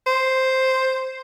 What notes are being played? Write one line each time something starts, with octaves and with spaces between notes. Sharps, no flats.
C5